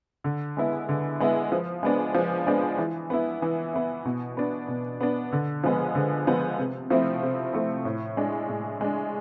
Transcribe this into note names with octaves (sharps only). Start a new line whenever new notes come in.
D3
G#3 B3 E4
D3
G#3 B3 E4
F3
G#3 B3 D4
F3
G#3 B3 D4
E3
B3 E4
E3
B3 E4
B2
B3 D4
B2
B3 D4
D3
F3 G#3 B3
D3
F3 G#3 B3
C3
F3 A3 C4 E4
C3
F3 A3 C4 E4
A2
G#3 D4
A2
G#3 D4